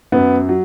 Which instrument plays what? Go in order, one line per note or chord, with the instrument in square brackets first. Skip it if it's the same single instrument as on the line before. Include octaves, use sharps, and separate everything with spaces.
[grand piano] F#2 B3
F#3